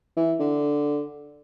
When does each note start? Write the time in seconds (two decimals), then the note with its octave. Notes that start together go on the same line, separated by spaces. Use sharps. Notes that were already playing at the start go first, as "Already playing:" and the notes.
0.17 E3
0.40 D3